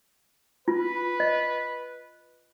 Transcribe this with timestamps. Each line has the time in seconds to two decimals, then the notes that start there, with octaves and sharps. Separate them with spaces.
0.68 F4 B4
1.20 D#5